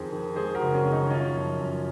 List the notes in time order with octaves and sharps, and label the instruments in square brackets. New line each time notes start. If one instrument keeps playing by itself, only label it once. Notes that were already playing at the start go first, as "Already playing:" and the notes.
Already playing: [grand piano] F2 D#3 G#4 C5
D#3
G#3 G#4 C5
F#4 A#4
F#1
C#4
D#3
D#4
F#2 C#4 F4
F3
F#2